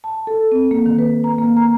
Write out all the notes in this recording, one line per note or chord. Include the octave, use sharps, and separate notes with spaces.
A5
A4
C4
A#3
D#3
B4
A#5
A#3
A#5